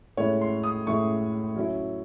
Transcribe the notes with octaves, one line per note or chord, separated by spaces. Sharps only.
A2 G#3 C#4 E4 C#5
C6
D#6
A2 G#3 C#4 E4 C#6
F#3 C#4 E4